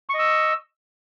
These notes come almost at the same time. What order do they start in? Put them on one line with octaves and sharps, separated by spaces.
C#6 D#5 E6